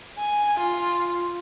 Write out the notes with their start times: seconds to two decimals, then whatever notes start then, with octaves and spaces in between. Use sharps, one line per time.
0.18 G#5
0.59 F4